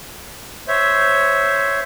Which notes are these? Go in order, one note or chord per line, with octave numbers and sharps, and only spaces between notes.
C5 C#5 E5